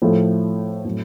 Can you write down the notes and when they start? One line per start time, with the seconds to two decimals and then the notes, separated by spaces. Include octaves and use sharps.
0.02 A2 F3 A3
0.85 A2 F#3